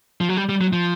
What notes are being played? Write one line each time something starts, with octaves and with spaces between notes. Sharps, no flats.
F3
F#3
G3
G3
F#3
F3